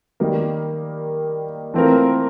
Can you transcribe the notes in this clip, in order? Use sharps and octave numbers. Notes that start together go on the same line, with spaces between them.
D#3 G3 A#3
E3 A3 C4 F4 A#4